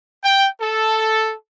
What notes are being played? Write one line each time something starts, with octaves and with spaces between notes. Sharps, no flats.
G5
A4